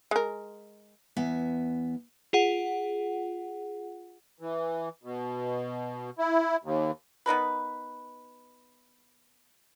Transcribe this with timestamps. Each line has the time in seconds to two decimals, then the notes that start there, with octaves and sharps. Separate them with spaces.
0.11 G#3 A#4
1.17 E2 B3 E5 G#5
2.33 F4 G#4 F#5
4.40 E3
5.03 B2
6.19 E4
6.64 D#2
7.26 B3 D#4 A#4 B4